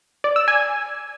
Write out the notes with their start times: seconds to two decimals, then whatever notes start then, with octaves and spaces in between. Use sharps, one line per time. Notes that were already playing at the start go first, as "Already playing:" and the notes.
0.24 D5
0.36 E6
0.48 G#5